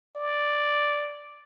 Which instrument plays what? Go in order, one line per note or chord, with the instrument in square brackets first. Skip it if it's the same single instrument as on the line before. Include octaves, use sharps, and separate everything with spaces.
[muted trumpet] D5